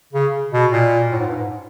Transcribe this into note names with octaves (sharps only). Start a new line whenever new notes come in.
C#3
B2
A#2
A2
G#2
G2
G#2